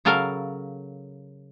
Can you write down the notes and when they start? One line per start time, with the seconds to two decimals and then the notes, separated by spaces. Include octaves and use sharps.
0.05 C#3 F#3 A4 A#4 F5